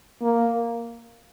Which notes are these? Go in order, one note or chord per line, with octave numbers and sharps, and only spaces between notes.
A#3